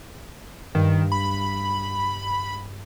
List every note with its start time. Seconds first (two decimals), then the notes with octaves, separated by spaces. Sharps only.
0.75 G2 D#3
1.12 B5